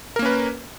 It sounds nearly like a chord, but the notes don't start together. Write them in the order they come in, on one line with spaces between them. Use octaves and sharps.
A#4 A#3 C#4 B4